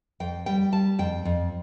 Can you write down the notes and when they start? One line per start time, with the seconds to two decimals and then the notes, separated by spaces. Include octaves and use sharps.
0.20 F2 G5
0.46 G3 G5
0.72 G3 A5
0.99 F2 G5
1.25 F2